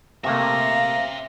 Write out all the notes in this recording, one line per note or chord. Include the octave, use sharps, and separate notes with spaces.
C3 A3 A#3 C5 E5 F5 A#5